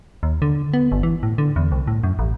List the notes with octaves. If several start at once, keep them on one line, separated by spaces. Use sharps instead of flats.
D#2
D3
B3
G1
E3
A2
D3
E2
C2
A2
F#2
A1